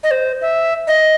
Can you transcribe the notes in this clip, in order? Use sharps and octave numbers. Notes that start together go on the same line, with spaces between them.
D#5
C5
E5
D#5